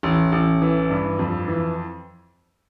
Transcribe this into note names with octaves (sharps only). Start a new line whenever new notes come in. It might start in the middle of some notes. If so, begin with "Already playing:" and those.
A1
A1
E3
G2
F2
E3